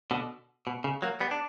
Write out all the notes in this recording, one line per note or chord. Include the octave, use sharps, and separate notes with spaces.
B2 D3
B2
C#3
F#3 A#3
G3 B3
D4